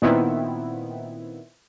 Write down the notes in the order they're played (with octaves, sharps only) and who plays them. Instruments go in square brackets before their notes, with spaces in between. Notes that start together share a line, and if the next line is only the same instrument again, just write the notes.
[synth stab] A#2 D#3 B3 C4 E4